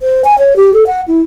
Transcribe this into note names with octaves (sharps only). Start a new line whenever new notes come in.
C5
G#5
C#5
G4
A4
F#5
E4